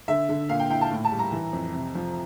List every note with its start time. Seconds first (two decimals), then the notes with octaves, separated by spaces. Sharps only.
0.08 D3 E5
0.29 D3
0.49 A#2 F5
0.60 G5
0.70 E4 G5
0.81 A5
0.92 A2
1.05 A5
1.12 G3
1.19 A#5
1.32 E3
1.53 F2
1.74 C3
1.95 F3